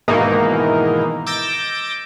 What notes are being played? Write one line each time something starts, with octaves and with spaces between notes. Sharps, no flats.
G#2 B2 D#3 E3 A#3 D#4
D6 E6 G6 A6 A#6 D7